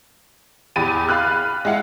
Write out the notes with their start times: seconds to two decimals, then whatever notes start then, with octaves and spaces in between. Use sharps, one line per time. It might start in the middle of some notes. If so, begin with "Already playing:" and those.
0.76 E2 G4 B5 A6 D#7
1.09 F5 B5 F6 F#6
1.65 G#3 E4 F5 F#5